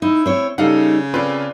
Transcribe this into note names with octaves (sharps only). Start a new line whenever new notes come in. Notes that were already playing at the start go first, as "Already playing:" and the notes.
D#4 E4
C4 C#5
C#3 G3 D#4 A4 F5 F#5
C4 F4 A4 B4 D5